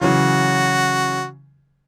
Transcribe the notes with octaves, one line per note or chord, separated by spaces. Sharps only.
C#3 E3 F#3 F#4